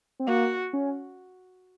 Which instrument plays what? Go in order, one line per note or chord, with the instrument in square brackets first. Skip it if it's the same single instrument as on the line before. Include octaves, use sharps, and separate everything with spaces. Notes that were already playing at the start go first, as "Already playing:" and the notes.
[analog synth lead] C4
[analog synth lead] A#3 [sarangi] F#4
[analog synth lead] C#4